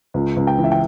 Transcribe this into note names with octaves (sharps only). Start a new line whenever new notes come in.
C#2
C#2
G5
E3
E5
G5